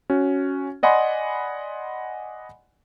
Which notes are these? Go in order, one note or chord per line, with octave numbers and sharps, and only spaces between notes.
C#4 F#4
D5 D#5 F#5 G#5 B5 C6